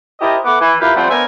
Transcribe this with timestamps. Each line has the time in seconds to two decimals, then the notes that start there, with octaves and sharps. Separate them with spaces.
0.21 E4 G4 A#4 C5 D#5 A5
0.44 A3 B3 F#5 D6
0.60 E3
0.81 E4 F4 G4 A#4 B4 F5
0.96 F3 G3 A3 C4 C5 F#5
1.10 B3 D4 A#4 C5 E5 G#5